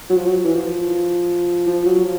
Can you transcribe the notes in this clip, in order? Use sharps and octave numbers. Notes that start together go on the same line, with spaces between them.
F#3
F3
F#3
E3
F3
F3
F#3
F3